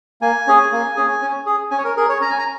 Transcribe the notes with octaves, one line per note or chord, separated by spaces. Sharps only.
A#3 G#5
C#4 G#4
A#3
C#4 G#4
C#4
G#4
C#4 G#5
C#5
A#4
G#4 A#4
C#5
C#4 A#5
G#5
A#5